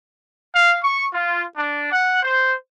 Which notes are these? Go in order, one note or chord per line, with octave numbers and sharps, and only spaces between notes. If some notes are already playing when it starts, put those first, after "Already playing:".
F5
C#6
F4
D4
F#5
C5